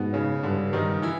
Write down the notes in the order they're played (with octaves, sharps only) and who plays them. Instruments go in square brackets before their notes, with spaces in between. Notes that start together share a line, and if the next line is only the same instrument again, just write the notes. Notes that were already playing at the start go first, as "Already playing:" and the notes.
Already playing: [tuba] G#2 [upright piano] B2 B3
[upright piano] C#3 C#4
[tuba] G2 [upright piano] D3 D4
[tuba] G2 [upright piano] D#3 D#4
[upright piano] E3 E4